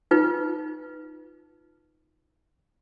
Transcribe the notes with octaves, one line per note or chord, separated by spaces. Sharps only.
D#4 F4 B4